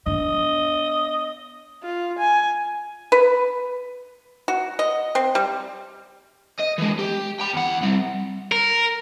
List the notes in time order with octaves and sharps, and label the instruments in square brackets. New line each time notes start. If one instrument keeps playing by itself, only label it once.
[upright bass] B3 D4 [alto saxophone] D#5
[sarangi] F4
G#5
[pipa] B4
F#4
D#5
C4
G3
[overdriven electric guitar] D#5
E3 G#3
G4
G5 B5
E2 F#5
G3 C4
[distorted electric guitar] A#4